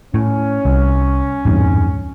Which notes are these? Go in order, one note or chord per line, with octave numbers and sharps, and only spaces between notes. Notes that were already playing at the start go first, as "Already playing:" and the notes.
A2 C#4
C2
D1 F2 G#2